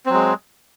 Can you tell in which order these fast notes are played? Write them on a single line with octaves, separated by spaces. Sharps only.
C4 F#3 G#3